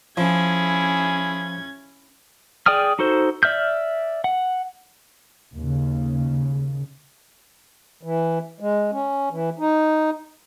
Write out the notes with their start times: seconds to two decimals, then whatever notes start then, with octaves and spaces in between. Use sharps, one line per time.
0.17 F3 C#4 E4 G#4 G#6
2.66 G#4 D5 G5 D#6 F6
2.99 D#4 F#4 A4 C5
3.43 D5 E5 F6 G6
4.24 F#5
5.57 D#2 C#3
8.03 E3
8.60 G#3
8.92 C#4
9.31 E3
9.59 D#4